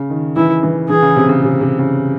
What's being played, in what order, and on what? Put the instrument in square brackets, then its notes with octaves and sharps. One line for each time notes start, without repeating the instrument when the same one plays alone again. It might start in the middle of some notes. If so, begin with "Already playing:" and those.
Already playing: [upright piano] C#3
D#3
[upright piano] E3 [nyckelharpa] E4
[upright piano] E3
[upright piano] E3 [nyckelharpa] G#4
[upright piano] C#3
C3
C#3
C3
C3
C#3